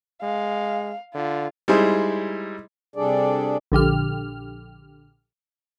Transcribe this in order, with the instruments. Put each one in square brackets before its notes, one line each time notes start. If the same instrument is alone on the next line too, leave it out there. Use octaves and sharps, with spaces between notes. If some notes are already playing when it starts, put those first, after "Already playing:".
[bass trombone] G#3 [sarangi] F5
[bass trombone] D3 [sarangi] F4
[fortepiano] G3 G#3 D#4 E4 G#4 C5
[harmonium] C3 G3 D4 G#4 A4 D5
[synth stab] A#1 D3 G4 F6